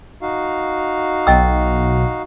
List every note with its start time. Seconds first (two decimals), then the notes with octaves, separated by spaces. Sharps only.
0.22 D#4 F#4 F5
1.27 B1 D#5 G5 E6